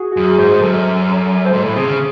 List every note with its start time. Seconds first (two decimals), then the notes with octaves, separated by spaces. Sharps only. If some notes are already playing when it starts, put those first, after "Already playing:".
Already playing: F#4 G#4
0.12 F#4
0.16 F#2 G#4
0.38 G#2 C5
0.62 F#2 A4
1.45 C5
1.52 G#2 A4
1.65 A2
1.76 C3 G#4
1.87 C#3